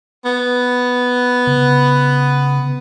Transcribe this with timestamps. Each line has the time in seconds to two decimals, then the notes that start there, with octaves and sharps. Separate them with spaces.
0.25 B3
1.47 C#3